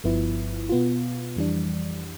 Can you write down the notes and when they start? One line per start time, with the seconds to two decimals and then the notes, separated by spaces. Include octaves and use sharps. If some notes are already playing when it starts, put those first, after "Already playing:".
0.04 G1 G2 F3 B3 E4
0.69 B2 B3 F4
1.36 F2 E3 G3 D4